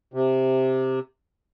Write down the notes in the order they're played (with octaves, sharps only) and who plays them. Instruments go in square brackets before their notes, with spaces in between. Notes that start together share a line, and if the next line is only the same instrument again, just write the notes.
[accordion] C3